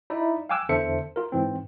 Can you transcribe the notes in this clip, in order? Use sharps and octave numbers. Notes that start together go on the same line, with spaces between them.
D#4 E4 D5 E5 B5
F5 G5 G#5 D6 E6 F#6
E2 D3 A4 C5 E5 C#7
F4 A#4
G#2 E3 C4